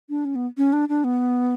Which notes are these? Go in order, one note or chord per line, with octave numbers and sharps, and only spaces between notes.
D4
C#4
B3
C#4
D4
D4
B3